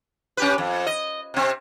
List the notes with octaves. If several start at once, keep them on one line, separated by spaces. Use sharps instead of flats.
C#4 G4 B4
F2
D#5
C3 C4